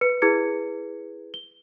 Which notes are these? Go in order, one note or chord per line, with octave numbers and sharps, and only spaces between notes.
B4 C#7
E4 G#4 B4 G#6 C#7
G7